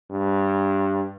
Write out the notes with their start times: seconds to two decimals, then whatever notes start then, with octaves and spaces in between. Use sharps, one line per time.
0.11 G2